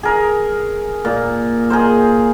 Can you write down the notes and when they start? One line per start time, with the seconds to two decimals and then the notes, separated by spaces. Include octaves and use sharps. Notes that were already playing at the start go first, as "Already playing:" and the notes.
0.03 G#4 A#4
1.05 A#2
1.70 G#4 A#4 C5